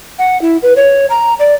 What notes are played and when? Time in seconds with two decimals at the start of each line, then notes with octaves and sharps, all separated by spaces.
0.19 F#5
0.42 E4
0.63 B4
0.76 C#5
1.10 A#5
1.39 D5